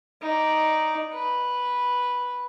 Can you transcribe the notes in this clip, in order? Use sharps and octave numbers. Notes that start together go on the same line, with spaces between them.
D#4 D5
B4